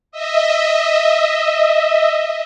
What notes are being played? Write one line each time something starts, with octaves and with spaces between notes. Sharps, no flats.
D#5 E5